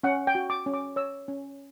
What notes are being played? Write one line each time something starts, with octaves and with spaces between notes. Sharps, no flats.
C#4 F#5
G5
F#4
D6
C#4
D6
C#5 E6
C#4